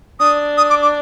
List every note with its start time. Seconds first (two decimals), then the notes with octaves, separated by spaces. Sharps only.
0.20 D4 D#6
0.58 D#6
0.70 D6
0.82 D6